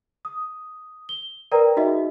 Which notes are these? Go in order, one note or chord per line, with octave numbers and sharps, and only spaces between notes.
D#6
G7
A#4 B4 D5 G5 A#5
D#4 F#4 G#4 D#5 E5